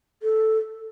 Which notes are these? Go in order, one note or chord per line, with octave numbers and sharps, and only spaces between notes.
A4